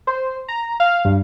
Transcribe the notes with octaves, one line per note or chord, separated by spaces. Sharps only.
C5
A#5
F5
G2